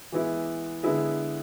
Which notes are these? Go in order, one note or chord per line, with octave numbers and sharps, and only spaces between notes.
E3 G#3 B3 E4
D3 G#3 B3 E4 G#4